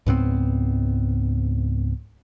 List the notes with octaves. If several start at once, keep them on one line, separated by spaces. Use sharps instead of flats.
C#2 G#2 B3 C4